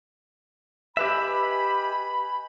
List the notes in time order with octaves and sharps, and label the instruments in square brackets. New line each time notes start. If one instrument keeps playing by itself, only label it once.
[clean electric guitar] G4 B4 E5 [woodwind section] D#5 G#5 B5